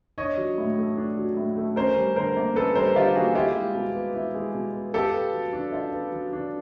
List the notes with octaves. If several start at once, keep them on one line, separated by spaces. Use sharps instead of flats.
D4 C#5 D#5
F#3
A2
A3
D4
F#3
A2
A3
C#4 A#4 C5
G3
D3 A#4 C5
A#3
C#4 A4 B4
G3 A#4 C5
D3 F4 G4
A#3 F#4 G#4
E4 F4 G4
G#3
B2
B3
E4
G#3
B2
B3
F4 G4 A4
B3
F#3
D4
F4
B3
F#3
D4